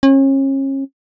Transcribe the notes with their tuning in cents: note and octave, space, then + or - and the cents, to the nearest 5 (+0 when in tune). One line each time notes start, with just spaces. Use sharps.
C#4 -35